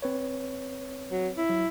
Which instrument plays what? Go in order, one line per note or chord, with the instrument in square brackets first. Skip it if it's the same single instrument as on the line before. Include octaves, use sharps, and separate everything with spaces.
[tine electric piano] C4 B4 C#5
[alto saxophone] F#3
E4
[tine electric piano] F#3